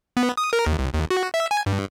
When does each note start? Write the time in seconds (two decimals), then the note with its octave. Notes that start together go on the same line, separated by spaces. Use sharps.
0.17 B3
0.37 D#6
0.53 A#4
0.66 D#2
0.79 C2
0.94 D#2
1.10 F#4
1.34 E5
1.51 G#5
1.66 G2